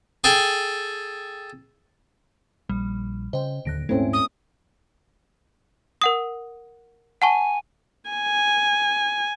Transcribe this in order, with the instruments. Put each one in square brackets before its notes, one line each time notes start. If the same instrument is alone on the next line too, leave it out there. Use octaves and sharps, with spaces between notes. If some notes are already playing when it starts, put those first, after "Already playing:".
[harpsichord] G#4 A4 G5
[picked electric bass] A#1 [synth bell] G3
[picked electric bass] C#3 [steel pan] C5 [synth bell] D#5 G5
[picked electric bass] D1 D#2 D3 [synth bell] F#6 A#6 D7
[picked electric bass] D#1 G#2 [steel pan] A3 C4 C#4 [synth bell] E4
[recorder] D#6
[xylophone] A#4 F#5 D#6
[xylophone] F#5 A5 C#6 [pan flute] G#5
[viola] G#5